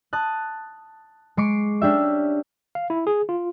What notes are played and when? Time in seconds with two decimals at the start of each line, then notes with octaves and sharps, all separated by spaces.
0.13 A5 D#6 F#6
1.37 G#3 C#6 D6 C7
1.81 C#4 D4 G4 E5
2.75 F5
2.90 E4
3.07 G#4
3.29 F4